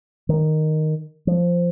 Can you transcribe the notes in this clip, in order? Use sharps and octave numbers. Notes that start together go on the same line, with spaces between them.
D#3
F3